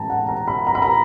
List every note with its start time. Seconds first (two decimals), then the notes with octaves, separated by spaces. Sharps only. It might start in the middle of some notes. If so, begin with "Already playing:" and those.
Already playing: A2 E3 G#3 C#4 G5 A5 A#5
0.10 F#5
0.28 A#5
0.48 B5
0.67 A#5
0.75 B5
0.82 A#5